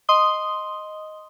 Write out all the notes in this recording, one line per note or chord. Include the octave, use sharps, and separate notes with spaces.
D#5 C6 D#6 G7